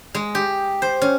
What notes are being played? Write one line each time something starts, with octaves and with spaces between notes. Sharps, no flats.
G#3
G4
C5
C#4